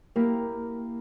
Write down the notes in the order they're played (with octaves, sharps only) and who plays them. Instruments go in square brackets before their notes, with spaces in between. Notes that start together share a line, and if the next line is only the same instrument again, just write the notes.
[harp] A#3 E4 G4 A#4